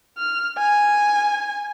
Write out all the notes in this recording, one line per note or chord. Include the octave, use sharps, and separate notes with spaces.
F6
G#5